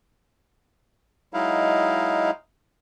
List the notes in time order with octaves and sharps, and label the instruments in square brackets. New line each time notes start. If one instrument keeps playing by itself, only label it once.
[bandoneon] F#3 G#3 D#4 E4 F5